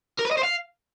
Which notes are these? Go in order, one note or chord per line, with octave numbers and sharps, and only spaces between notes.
A#4
B4
D#5
C5
F5